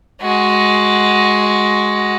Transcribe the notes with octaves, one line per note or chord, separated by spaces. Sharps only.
G#3 F#4